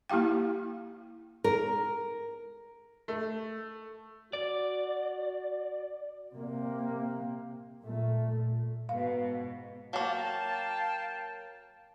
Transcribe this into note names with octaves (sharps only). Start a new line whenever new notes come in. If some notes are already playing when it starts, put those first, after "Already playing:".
A#3 E4 G4 F5 G5
A#4
A3
F#4 D5
C3 A#3
A#2 A3
G#2 B2 F5
F#3 A#3 F5 G5 A5